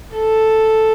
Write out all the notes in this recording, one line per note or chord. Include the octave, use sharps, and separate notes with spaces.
A4